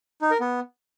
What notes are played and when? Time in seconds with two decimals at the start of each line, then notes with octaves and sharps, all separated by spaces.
0.22 D#4
0.31 A#4
0.40 B3